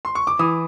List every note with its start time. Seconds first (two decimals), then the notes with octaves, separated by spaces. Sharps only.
0.05 C6
0.15 C#6
0.27 D6
0.39 E3 D#6